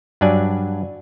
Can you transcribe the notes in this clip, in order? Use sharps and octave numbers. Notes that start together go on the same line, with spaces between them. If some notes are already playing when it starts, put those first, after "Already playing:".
G2 F#3 D4 D5 G#5